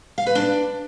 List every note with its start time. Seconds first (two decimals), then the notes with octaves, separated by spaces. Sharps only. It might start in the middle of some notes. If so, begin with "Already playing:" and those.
0.18 F5
0.27 B4
0.35 D4